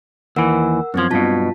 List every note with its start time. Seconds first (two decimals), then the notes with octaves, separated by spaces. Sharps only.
0.36 D#2 E3 A#4 F#5 E6
0.94 F#2 F3 B3 C4 G#6
1.11 B1 G2 B2 F4 A5 B6